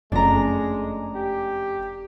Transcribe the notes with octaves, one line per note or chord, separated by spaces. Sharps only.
F#1 F2 G#3 A3 C#4 D4 A#5
G4